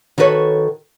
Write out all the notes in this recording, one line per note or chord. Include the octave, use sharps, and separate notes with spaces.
D#3 F#4 A4 B4 C#5